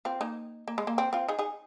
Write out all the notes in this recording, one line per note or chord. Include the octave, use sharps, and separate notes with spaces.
C4 F4
A#3 D#4
A#3
G#3
A#3
C4
C4 F4
D#4 G#4
D#4 G#4